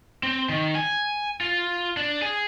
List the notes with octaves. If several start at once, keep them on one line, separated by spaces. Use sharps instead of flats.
C4
D#3
G#5
F4
D4
G#4